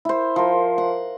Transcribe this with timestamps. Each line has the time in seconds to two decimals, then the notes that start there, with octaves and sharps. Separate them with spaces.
0.05 E4 C5
0.36 F3 A#4
0.78 F#5